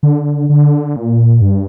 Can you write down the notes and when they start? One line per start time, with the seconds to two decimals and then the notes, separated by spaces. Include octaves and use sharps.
0.03 D3
0.49 D3
0.96 A#2
1.42 G2